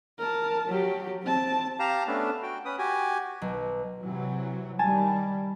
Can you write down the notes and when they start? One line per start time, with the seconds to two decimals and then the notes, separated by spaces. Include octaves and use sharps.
0.18 A#4 A5
0.68 F#3 G4
1.22 C4 A5
1.79 G4 F5 A5 A#5
2.07 A3 B3 C#4 D4
2.43 F#4 G5
2.65 C#4 B4 D#6
2.79 F#4 G4 G#5
3.42 B1
4.01 C3 E3 F#3
4.79 D#3 G3 G#5 A5